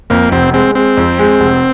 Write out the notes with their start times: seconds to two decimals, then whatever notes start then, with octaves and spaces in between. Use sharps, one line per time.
0.10 F2 A#3
0.32 F1 C4
0.53 G#3 C4
0.75 G#3 C4
0.97 F2
1.19 G#3
1.40 F1